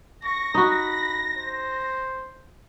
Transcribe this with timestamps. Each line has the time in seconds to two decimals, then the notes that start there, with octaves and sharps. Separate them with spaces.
0.24 C#6 A#6
0.54 D#4 F#4 B5
1.37 C5